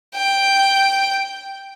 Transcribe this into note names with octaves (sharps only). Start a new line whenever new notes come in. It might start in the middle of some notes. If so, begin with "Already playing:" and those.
G5